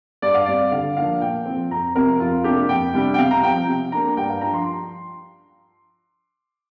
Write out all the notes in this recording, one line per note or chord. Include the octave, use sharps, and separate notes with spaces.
G2 D5
F5
G3 C4 D5
D3 F5
F3 A#3 D4 F5
A#2 G5
F3 C4
F2 A#5
C3 F3 C4 A#4
F2 F4
C3 A#3 D4 G4
F2 G5
C3 G3 D4
G5
C3 F5
A#5
F3 C4 G5
C3
A#3 D4 A#5
G2 G5
F5
F3 D4 A#5
C6